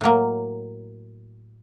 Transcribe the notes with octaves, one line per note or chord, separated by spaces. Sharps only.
A2 F#3 A#3